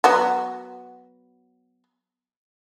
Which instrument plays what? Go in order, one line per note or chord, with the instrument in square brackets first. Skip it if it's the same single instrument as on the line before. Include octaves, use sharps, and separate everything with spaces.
[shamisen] F#3 B3 F#4